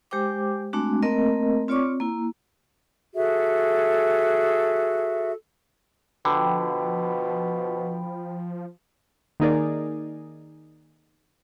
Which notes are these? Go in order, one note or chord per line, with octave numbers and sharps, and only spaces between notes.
G#3 G4 C5 G5 D6
G#3 A3 C4 D4 F#4
A3 A#3 C4 A#4 D#5
C4 F4 C#5 D5 C#6 D6
A#3 E4
F#4 G#4 A4 E5
B2 D3 F3 G5 B5
D#3 A#3 D#4 G#4 A#4 D5